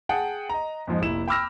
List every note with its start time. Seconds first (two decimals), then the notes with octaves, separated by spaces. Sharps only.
0.09 G#4 F#5 G5 A5
0.49 D#5 A#5
0.87 F2 G#2 F3 G#3
1.01 F1 A#1 E4 E7
1.28 G5 B5 D6 E6 F6 A#6